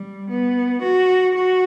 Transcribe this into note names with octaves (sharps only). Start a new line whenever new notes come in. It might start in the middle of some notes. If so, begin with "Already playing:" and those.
Already playing: G3
B3
F#4
F#4